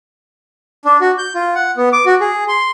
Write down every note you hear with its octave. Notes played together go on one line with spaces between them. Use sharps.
D4
F#4
G6
F4
F#5
B3
D6
F#4
G#4
C6